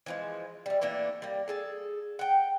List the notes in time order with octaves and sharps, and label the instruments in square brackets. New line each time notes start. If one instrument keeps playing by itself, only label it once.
[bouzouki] E3 F3 G#3
G3 A3
E3 A3 A#3 D4
G3 A#3
G#4 A4 A5
F#5 G5